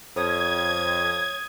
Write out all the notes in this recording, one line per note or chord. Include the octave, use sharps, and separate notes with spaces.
F2 C#5 D#6 G#6